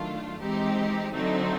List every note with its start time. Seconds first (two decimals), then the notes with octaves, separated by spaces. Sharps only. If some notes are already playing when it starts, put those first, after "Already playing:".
Already playing: D#3 F#3 A3 D4 F4
0.41 E3 G#3 C4 D#4 G4
1.12 D3 F#3 A3 C4 D#4